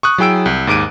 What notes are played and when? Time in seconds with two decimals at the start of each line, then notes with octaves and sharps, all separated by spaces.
0.03 C#6 D#6 F#6
0.18 F#3 E4 G#4 G5 E6 D7
0.46 C2
0.67 D#2 G#2 D6 D7 D#7